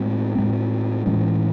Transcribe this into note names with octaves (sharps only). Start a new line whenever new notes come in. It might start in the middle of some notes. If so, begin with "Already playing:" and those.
Already playing: A2 G#3 C4
A2 G#3 C4
A2 E3 G#3 C#4